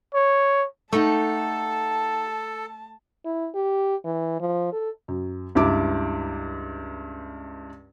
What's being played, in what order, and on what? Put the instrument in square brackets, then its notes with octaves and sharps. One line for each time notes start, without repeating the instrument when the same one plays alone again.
[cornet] C#5
[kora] A3 [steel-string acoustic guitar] D#4 G4 F#5 [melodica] A4 [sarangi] A5
[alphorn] E4
G4
E3
F3
A4
[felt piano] F#2
C#2 G2 E4 D6